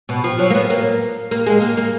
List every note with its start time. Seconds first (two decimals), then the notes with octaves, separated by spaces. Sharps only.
0.09 B2
0.24 F3
0.39 F#3
0.50 A#3
0.55 B3
0.70 A#3
1.31 A#3
1.46 G#3
1.61 A#3
1.77 A#3